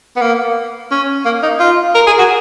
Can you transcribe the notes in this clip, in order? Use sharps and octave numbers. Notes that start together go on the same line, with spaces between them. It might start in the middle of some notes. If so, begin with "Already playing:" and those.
B3
A#3
C#4
A#3
D#4
F4
A#4
G#4
F#4